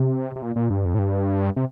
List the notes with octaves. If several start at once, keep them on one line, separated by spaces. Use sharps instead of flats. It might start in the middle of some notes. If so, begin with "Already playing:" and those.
Already playing: C3
C3
A#2
A#2
G2
F2
A2
G2
C3